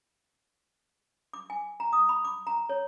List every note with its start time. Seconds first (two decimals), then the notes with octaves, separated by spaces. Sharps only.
1.33 D6
1.50 G#5
1.80 A#5
1.93 D#6
2.09 B5
2.25 D6
2.47 A#5
2.69 C#5